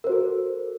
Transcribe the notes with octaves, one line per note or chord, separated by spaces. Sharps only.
F#4 A4 A#4 C5